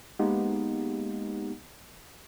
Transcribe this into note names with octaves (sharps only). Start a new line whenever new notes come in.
G#3 A#3 B3 D#4 G4